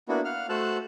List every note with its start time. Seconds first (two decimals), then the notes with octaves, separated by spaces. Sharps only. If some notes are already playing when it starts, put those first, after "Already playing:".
0.09 A#3 B3 D4 E4 F#4
0.25 F5 F#5 F6
0.49 A3 F#4 C5 A5 E6 F#6